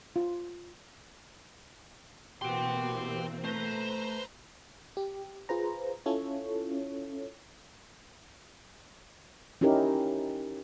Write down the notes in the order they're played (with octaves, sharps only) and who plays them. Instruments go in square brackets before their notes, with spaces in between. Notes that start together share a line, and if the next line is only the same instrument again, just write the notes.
[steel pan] F4
[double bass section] B2 E3 A#3 [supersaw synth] B3 F#4 [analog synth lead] G4 [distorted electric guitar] G5 C6
[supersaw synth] C4
[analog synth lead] A3 [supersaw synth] B4 A#5 [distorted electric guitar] C5
[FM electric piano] G4
F4 G#4 B4 C5 A#5
C#4 E4 F4 A4 C#5
[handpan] C#4 D#4 E4 G4 A#4